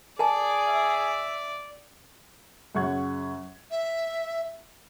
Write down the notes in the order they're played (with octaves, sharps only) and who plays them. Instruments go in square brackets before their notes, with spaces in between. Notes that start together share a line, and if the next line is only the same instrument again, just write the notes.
[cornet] G#4 [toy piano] A#4 G#5 A5 [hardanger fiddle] D5
[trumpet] E5
[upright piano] F#2 C#3 F#5 C#6 G#6
[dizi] E5